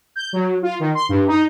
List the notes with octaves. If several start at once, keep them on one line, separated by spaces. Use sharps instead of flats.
G6
F#3
F4
D#3
C6
G2
D#4